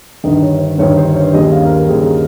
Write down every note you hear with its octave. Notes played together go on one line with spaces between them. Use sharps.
G1 G2 D#3 D#5
C#5
C5
G1 G2 D#3 C#5
C5
C#5
D#2 C#3 G3 D#5
F5
A#4
C5
D#2 C#3 G3 G#4